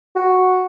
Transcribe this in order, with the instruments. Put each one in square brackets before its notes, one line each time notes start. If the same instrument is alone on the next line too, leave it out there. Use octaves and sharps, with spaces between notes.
[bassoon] F#4